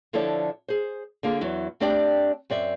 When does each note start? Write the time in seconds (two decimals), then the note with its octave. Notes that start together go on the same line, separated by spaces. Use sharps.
0.13 D3 F3 E4 A4 C#5 D5
0.68 G#4 C5
1.23 D3 A#3 F4 G#4
1.41 E2 F#3 E4
1.80 A3 C4 D4 G4 D5 G5
2.50 F#2 C4 D5 E5